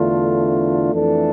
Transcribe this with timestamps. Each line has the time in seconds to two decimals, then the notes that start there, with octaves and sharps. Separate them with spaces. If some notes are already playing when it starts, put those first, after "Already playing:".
Already playing: E2 D3 A3 D4 F4
0.92 F2 E3 A3 D4 A4